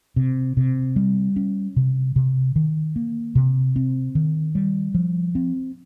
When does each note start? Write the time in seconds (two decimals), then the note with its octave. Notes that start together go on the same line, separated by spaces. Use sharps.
0.16 C3
0.57 C3
0.96 G3
1.36 C#4
1.76 C3
2.16 C3
2.56 D#3
2.96 A#3
3.35 C3
3.76 C4
4.15 D#3
4.55 G3
4.94 F3
5.35 C4